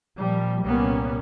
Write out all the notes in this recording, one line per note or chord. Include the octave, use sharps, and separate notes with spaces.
A#2 F3 G3
C2 A#2 G3 A#3 B3 C#4